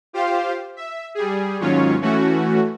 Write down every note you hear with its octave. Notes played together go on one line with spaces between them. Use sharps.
F4 G4 C5 F5
E5
G3 G#4
D#2 G#2 F#3 C#4 F4 C#5
E3 A3 C#4 F#4